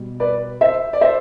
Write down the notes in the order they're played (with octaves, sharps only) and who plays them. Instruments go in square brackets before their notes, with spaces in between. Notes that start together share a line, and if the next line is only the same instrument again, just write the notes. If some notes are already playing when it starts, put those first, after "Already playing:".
Already playing: [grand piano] B2 G3
B4 D5
C5 E5
D5
C5 E5